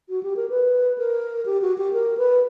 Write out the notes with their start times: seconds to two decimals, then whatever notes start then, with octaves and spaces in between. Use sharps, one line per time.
0.09 F#4
0.23 G4
0.36 A#4
0.50 B4
0.98 A#4
1.46 G4
1.62 F#4
1.78 G4
1.93 A#4
2.18 B4